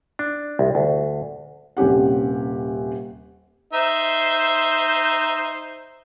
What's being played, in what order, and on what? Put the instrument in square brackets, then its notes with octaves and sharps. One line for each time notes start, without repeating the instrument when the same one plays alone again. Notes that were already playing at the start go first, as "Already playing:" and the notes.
[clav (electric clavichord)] D4
C2
D2
[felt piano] D#1 C3 C#4 G4 F#5
[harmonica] D#4 C5 E5